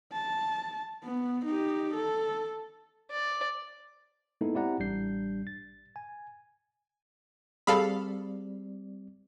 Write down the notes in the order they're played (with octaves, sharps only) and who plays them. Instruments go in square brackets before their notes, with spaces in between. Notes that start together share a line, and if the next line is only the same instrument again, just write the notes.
[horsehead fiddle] A5
B3
D#4 G4
A4
[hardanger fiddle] D5
[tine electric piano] G#3 A#3 B3 D#4 E4 A4
C4 E4 G4 D5 F#5 A#5
A1 G3 D4 G6 C7
A6
G#5
[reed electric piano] G3 C4 D5 [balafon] G#4 [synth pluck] A4 F5 B5